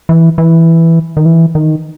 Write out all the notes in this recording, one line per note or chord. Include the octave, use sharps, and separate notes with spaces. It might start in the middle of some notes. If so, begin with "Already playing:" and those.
E3
E3
D#3
E3
D#3